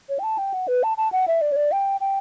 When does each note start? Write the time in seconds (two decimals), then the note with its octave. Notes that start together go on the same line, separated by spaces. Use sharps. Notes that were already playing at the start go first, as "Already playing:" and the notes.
0.09 C#5
0.19 G5
0.23 A5
0.38 G5
0.54 F#5
0.68 B4
0.83 A5
0.97 A5
1.12 F#5
1.28 E5
1.41 D5
1.52 C#5
1.56 D5
1.72 G5
2.01 G5